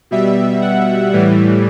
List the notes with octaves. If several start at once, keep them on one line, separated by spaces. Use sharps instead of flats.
B2 G3 E5
F#5
A2 E3 G3